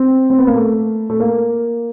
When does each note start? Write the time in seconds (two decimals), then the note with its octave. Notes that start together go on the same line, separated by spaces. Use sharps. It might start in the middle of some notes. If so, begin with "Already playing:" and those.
Already playing: C4
0.30 C4
0.39 B3
0.47 A#3
0.55 A3
1.10 A3
1.20 A#3